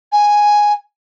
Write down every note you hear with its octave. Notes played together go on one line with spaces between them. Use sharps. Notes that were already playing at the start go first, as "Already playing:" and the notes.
G#5